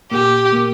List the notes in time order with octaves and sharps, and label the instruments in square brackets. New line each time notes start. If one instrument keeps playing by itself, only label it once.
[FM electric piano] A#2 A#3 [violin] G4
[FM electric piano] A#2 A#3